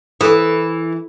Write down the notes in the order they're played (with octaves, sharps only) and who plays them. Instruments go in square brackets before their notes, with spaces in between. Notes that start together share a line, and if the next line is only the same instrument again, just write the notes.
[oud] E3 [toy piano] A4 D#6